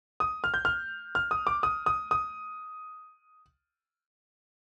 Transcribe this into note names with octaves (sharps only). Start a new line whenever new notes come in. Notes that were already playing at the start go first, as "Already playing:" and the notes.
D#6
F6
G6
F6
F6
D#6
D6
D#6
D#6
D#6